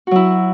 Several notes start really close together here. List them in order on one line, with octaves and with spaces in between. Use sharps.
F#4 F#3 E4